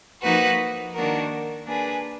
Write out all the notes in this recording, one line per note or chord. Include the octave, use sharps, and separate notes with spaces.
F3 A#3 D#4 F#4 B4
D#3 A#3 D4 F#4 A#4
A#3 D4 G#4 B4